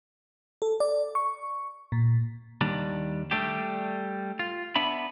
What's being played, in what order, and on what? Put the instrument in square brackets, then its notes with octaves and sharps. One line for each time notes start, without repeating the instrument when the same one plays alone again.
[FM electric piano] A4
D5
C#6
A#2
[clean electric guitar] D#2 D#3 G3 D4
G3 A3 D4 G4
F4
B3 D4 E5 B5